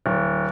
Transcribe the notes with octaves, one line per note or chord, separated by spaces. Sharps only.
D1